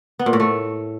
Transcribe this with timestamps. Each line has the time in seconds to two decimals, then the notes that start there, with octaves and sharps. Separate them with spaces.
0.19 B3
0.26 A#2
0.33 A2
0.40 A3